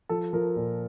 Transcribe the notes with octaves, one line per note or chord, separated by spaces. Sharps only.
F3 A4
F3 A#4
A#2